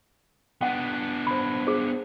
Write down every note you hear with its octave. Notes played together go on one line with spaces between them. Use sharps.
B3 D4 F#5 G5
C5 B5
G#4 C5